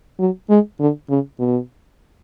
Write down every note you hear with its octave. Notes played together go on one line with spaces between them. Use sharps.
F#3
G#3
D3
C#3
B2